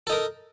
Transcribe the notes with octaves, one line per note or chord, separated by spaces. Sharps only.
D#4 A4 A#4